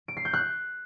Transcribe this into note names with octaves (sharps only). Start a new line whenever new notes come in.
D7
C7
G6
F#6